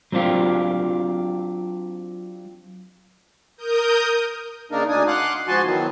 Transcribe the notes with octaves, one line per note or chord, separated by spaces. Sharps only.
F#3 C4 D4 F4 G4
A#4 D#6 G6
C#3 A#3 D4 D#4 A#4
D2 D4 D#4 G#5 D#6
F5 F#5 C6 D6 F#6
G#2 F3 F#4 G#5 A5 C6
D#3 E3 F#3 B3